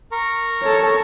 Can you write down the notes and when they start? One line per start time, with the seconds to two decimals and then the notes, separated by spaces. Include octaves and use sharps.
0.12 A#4 A#5 C#6
0.63 A4 C#5